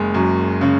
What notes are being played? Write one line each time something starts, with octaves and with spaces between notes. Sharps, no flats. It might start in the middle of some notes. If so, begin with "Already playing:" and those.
Already playing: F#1 G#3
F#2
C#3